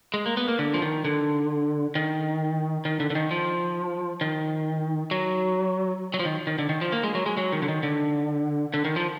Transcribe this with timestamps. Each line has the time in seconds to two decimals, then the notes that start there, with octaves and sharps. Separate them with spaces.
0.14 G#3
0.26 A#3
0.37 B3
0.48 A#3
0.59 D3
0.74 F3
0.82 D#3
1.05 D3
1.95 D#3
2.85 D#3
3.00 D3
3.10 D3
3.15 D#3
3.31 F3
4.21 D#3
5.11 F#3
6.14 F#3
6.19 F3
6.25 D#3
6.47 D#3
6.59 D3
6.69 D#3
6.81 F3
6.92 A#3
7.03 G#3
7.15 F#3
7.26 G#3
7.37 F#3
7.52 D#3
7.62 D3
7.68 D#3
7.83 D3
8.74 D3
8.85 D#3
8.96 F3